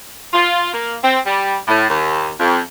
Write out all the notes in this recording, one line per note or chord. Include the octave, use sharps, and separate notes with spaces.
F4
A#3
C4
G3
A2
D#2
F2